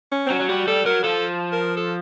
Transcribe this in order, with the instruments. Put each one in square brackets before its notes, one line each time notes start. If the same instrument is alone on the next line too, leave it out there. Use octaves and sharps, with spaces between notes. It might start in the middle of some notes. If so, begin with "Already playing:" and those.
[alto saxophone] C#4
C4
[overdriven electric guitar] F#3 [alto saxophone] C#4
[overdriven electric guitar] F#3
[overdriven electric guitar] G3 [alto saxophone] F#4
[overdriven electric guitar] G3 [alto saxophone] A4
[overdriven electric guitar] F#3 [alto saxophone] A#4
[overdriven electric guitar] F3 [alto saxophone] A4
[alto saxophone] A#4
A4